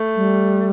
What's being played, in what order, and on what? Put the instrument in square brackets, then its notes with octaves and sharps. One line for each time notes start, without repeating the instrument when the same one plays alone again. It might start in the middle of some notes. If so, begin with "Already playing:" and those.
Already playing: [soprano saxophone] A3
[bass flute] G3